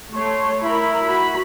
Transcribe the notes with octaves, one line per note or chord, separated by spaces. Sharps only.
A3 C#5 C6
E4 A#4 B5
F#4 B5